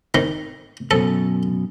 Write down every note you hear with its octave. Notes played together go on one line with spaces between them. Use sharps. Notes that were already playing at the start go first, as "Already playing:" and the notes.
D#3
F#2 B2 A4